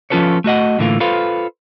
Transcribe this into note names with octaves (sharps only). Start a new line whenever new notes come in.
F3 C#4 F4 A4 B4 C#5
A3 F#4 D#5 F#5
A2 D3 E3 A3 A#3 F4
F4 A4 B4 C5 F5